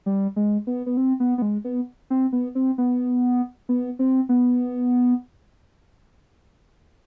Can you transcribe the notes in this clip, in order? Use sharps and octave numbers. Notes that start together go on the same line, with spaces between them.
G3
G#3
B3
B3
C4
B3
B3
G#3
B3
C4
B3
C4
B3
B3
C4
B3